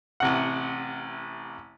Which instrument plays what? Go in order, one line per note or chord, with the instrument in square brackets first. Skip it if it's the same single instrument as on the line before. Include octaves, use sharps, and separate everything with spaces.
[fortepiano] A1 C3 F#5